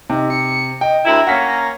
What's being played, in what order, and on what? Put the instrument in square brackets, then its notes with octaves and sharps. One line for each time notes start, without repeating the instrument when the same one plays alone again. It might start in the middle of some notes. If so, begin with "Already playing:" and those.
[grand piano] C3 [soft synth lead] D#4
[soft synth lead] C#7
[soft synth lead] D#5 [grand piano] G5
[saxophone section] D2 E4 [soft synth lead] A#5
[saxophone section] A#3 C#4 [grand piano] F#5 B6